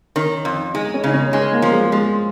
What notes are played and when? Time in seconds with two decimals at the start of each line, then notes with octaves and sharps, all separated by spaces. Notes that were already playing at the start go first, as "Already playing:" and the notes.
0.16 D#3 C#4
0.45 F2
0.74 G#3 D#4
0.94 C#4
1.04 C#3 D#4
1.13 C#4
1.33 G#3 C#4
1.53 A#3
1.62 F3
1.72 G#3
1.92 F3 G#3